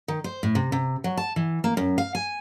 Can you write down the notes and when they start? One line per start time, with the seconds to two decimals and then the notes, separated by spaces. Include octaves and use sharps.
0.08 D#3
0.24 C5
0.43 A2
0.55 C3
0.72 C3
1.04 F#3
1.17 A5
1.36 E3
1.64 A#3
1.77 F#2
1.98 F5
2.15 G#5